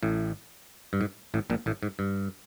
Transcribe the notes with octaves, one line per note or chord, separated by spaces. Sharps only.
A1 A2
G2
G#2
A1 A2
A#1 A#2
A1 A2
G#2
G2